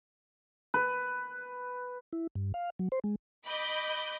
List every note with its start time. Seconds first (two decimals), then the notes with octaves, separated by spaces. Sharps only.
0.74 B4
2.13 E4
2.35 G2
2.54 F5
2.79 F#3
2.92 C5
3.04 G#3
3.47 D#5 B5 D6 G6